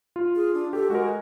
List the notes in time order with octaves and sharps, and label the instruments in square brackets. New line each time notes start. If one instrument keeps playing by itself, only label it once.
[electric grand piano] F4
[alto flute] G#4
D4
[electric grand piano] G4 [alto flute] A4
[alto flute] G#3 [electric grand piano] F#4 A#4